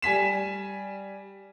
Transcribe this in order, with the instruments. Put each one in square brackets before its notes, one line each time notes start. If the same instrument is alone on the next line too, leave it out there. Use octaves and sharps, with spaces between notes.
[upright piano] G3 G#5 B6 E7